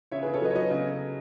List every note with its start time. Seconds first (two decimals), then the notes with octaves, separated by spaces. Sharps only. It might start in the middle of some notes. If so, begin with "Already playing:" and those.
0.11 C#3 C#5 E5
0.22 C#3 G#4 B4
0.34 A4 C#5
0.41 F#3 B4 D#5
0.51 C#5
0.55 F#3 B4 D#5
0.70 C#3